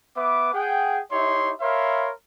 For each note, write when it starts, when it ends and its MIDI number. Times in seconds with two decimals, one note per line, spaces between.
0.16 0.51 59
0.16 0.51 71
0.16 0.51 76
0.16 0.51 86
0.53 0.99 68
0.53 0.99 78
0.53 0.99 79
1.11 1.52 63
1.11 1.52 64
1.11 1.52 67
1.11 1.52 73
1.11 1.52 76
1.11 1.52 84
1.60 2.10 70
1.60 2.10 73
1.60 2.10 76
1.60 2.10 77
1.60 2.10 83
1.60 2.10 84